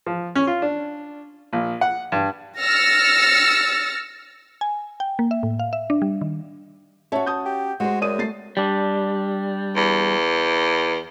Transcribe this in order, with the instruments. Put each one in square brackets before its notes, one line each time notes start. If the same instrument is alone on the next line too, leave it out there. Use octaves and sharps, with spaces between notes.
[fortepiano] F3
C#4
F4
D4
A#1
F#5
G2
[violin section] E6 F6 A6 A#6 C#7
[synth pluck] G#5
G5
A#3
E5
A2
F5
E5
D4
G3
D#3
[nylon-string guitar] C#4 F#4 [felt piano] C#5 E5 A5
[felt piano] A5 D#6 G6
[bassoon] G4
[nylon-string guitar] G#3 C5 [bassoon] F#4 [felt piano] G#4
[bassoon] F#2 [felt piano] D5 D#6 D#7
[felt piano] A3 A6 C7
[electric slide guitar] G3 D4
[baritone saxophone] E2